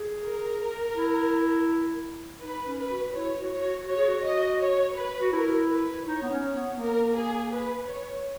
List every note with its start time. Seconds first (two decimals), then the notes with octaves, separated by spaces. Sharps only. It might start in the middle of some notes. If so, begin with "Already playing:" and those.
Already playing: G#4
0.22 A#4
0.95 E4
2.41 D#4 B4
2.65 C#4
2.78 B4
2.90 F#4
3.14 E4 C#5
3.38 F#4
3.50 C#5
3.62 F#4
3.86 F#4 C#5
3.97 G#4
4.07 F#4
4.23 D#5
4.60 C#5
4.96 B4
5.22 F#4
5.32 E4 A#4
5.69 B4
6.05 D#4 C#5
6.22 B3
6.30 C#4
6.42 C#5
6.54 B3
6.73 B3
6.78 A#3 A#4
7.14 G#4
7.51 B4
7.87 C#5